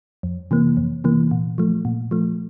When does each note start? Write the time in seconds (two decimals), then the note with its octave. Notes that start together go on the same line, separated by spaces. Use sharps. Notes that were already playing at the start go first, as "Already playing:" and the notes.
0.23 F2
0.51 C3 E3 A#3
0.77 F2
1.04 C3 E3 A#3
1.31 A#2
1.58 F3 A3
1.85 A#2
2.11 F3 A3